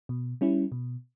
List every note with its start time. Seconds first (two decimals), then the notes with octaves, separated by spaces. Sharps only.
0.09 B2
0.41 G3 C#4 E4
0.72 B2